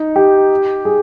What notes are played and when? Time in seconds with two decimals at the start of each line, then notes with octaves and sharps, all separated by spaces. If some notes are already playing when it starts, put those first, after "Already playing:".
Already playing: D#4
0.16 G4
0.85 G#4